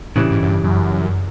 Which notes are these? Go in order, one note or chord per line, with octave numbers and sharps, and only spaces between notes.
A2 C#3 E3 G3
G#2
F#2
G2
F#2